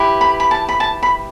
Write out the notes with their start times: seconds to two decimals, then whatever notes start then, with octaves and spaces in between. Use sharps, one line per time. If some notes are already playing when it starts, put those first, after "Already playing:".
Already playing: E4 G4 B4
0.21 B5
0.40 B5
0.51 A5
0.69 B5
0.80 A5
1.03 B5